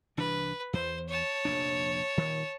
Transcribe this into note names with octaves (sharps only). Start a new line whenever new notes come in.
C2 E3 D4 B4
E2 C5
C#5 A5
F1 A#1 D4
D#1 D#3